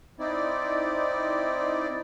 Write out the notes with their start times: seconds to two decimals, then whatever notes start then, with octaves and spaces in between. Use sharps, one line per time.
0.20 C4 D#4 E4 D5